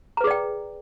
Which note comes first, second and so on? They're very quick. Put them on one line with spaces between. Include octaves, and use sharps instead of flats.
A#5 B4 G#4 D5 G5